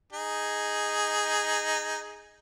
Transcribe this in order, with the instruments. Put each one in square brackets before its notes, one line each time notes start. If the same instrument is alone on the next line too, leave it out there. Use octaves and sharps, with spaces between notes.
[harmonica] D#4 G#4